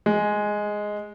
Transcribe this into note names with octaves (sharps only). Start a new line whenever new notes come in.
G#3